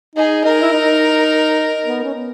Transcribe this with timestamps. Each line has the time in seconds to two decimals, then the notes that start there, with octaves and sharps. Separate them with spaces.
0.15 D#4 G#4
0.44 D#4 A#4
0.62 E4
0.73 D#4
1.85 B3
2.04 C#4
2.14 B3